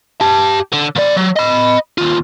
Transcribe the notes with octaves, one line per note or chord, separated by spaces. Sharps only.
G4 A5
D3
F3 D5
F#3
D#5 B5
D#2 F4